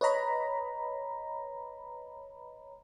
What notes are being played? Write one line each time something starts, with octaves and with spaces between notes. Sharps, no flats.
B4 C#5 D#5 A#5 B5